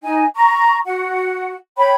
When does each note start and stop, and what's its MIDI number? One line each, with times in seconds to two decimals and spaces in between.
0.03 0.25 63
0.03 0.25 75
0.03 0.25 80
0.35 0.78 82
0.35 0.78 85
0.85 1.54 66
0.85 1.54 78
1.77 1.95 73
1.77 1.95 79
1.77 1.95 83